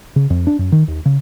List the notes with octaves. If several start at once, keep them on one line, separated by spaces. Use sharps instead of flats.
C#3
F2
D4
F#2
D#3
D#2
C#3